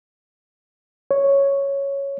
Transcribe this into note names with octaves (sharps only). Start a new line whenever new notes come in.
C#5